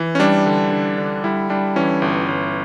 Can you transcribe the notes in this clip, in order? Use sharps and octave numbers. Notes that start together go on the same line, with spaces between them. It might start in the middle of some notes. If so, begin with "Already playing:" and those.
Already playing: E3
C#4
G3 D4
D3
D3
D3
G3 E4
G3 D4
E3 C#4
G1
G1